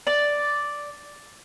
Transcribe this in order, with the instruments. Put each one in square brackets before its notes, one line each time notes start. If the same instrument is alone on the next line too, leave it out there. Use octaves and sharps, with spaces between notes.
[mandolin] D5